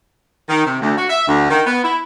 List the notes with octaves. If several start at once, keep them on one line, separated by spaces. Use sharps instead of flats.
D#3
C3
D2
F#4
E5
D2
D#3
B3
E4